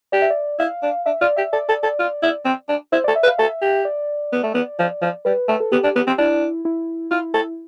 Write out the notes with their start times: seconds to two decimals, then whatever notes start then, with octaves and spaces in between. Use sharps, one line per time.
0.12 G4 D5
0.22 E5
0.30 D5
0.59 E4 F5
0.83 D4
1.06 D4 E5
1.21 F4 D5
1.36 G4 E5
1.53 A4 D5
1.69 A4
1.83 A4
1.99 F4
2.23 E4
2.45 C4
2.69 D4
2.92 E4 C5
3.04 A4 D5
3.15 E5
3.23 B4
3.27 F5
3.38 A4 E5
3.62 G4
3.85 D5
4.33 B3
4.43 A3
4.54 B3
4.79 F3
5.02 F3
5.25 G3 B4
5.49 A3
5.60 A4
5.72 B3 G4
5.84 D4
5.96 B3
6.07 C4
6.18 D4 E4
6.65 E4
7.11 E4 F4
7.34 A4